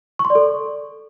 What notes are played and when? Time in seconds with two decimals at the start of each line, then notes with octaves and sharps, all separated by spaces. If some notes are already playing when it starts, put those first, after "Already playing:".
0.19 C#6
0.25 C6
0.30 D5
0.35 A4